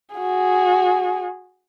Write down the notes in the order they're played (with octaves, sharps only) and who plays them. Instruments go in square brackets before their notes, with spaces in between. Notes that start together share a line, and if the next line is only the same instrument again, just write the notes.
[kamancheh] F#4 G#4